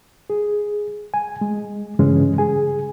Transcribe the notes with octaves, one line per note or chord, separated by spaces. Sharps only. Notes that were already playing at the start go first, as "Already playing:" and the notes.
G#4
G#5
G#3
G2 C#3 E3 G#3 C#4
G#4 G#5